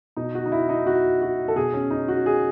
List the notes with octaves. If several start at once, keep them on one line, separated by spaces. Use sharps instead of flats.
B2 D#4
F#4
D#4
E4
D#4
F#4
F#4
A4
B2 G#4
C#4
D#4
F#4
G#4